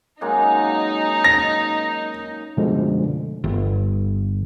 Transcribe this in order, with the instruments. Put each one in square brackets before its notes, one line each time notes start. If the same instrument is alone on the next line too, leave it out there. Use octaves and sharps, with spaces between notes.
[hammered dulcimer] F#2 G#3 A#3 [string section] D#4
[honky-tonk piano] A#6
[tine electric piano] F#2 B2 D3 F3 G#3 A3
[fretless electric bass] G1